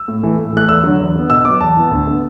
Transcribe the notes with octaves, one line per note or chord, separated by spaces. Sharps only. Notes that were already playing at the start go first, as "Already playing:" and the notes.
Already playing: E6
A2
E3 A3
A2
E3 A3 F#6
E2 E6
D3 F#3
E2
D3 B3
B2 E6
F#3 B3 D6
E2 A5
E3 B3
D2
D3 B3